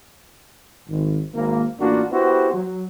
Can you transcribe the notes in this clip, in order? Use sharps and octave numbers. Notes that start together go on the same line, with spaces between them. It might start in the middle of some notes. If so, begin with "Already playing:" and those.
G#1
G#1 A#3
A1 A#3 D4 F4 F#4
B3 E4 F#4 G4 C5
F#3